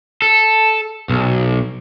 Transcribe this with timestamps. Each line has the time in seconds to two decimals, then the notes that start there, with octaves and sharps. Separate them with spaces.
0.22 A4
1.09 B1